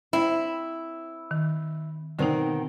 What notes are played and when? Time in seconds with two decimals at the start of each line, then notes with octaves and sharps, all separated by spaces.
0.13 C4 E4
1.31 D#3
2.19 B2 D3 D#3 C4 D#4